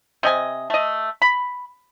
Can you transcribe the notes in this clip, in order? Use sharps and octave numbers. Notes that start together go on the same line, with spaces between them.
C3 D#5 G#5
A3 D#5
B5